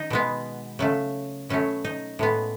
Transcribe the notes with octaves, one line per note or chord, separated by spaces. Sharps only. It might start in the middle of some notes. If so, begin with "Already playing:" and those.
Already playing: D#3 D#4
B2 G#3 B3
C#3 F#3 A3
B2 F#3 A3 C#4
D#4
A2 G#3 B3